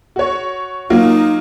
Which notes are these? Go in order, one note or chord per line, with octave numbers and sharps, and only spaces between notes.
F#4 C#5
F#3 A#3 D#4 F4